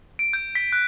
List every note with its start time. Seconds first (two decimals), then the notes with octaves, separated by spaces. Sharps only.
0.19 D7
0.33 G6
0.55 B6
0.72 F#6